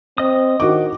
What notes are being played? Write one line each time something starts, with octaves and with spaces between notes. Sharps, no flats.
C4 D#5 D#6
D#3 F#4 D6